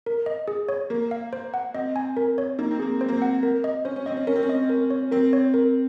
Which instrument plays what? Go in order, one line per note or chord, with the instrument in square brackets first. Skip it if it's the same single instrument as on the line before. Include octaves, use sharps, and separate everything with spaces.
[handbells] A#4
D#5
G#4
C#5
[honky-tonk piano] A#3 [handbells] A#4
[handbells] F5
C5
F#5
[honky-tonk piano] C4 [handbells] D#5
[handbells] G#5
A#4
C#5
[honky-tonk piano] A#3 [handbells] D#4
[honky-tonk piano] C4
[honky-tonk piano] A#3 [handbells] G#4
[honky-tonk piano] C4 [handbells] C5
[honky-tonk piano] A#3
[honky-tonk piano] C4 [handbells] F#5
[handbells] A#4
D#5
[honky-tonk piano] C#4 [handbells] C5
[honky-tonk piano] C#4
[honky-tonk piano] C4 [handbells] D#5
[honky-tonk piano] C#4
[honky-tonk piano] C#4 [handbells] A#4
[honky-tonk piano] C4
C#4
[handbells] D#5
A#4
C#5
[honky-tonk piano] C4 [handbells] A#4
[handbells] C#5
A#4